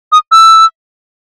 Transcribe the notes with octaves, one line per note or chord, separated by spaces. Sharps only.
D#6
E6